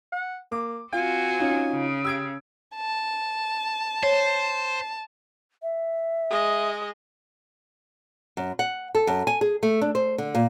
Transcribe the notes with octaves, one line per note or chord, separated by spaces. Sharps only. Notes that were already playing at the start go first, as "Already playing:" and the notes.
F#5
A#3 D6
C4 F4 F#4 G#5
C#4 D#4 F4
C#3
G4 E6 G#6 D7
A5
C5 C#5
E5
G#3 D#5
F#2
F#5
A4
F#2
G#5
G#4
A3
D4
C5
D3
A#2